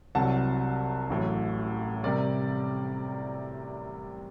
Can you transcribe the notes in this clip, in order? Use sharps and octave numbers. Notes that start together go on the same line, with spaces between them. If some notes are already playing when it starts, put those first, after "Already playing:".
C2 C3 F#3 F#5 A5
A1 A2 F#3
C3 G3 A#4 D5